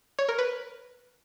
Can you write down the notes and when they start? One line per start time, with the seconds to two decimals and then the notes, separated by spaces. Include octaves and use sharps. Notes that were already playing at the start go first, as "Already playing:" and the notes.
0.19 C#5
0.29 A#4
0.38 B4